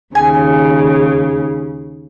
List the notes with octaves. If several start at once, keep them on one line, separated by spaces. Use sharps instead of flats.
D#2 C#3 G#5